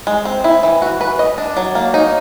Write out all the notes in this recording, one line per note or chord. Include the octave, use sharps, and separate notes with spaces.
G#3
C4
E4
E3
F#4
B4
D#5
D4
F#3
A#3
D#4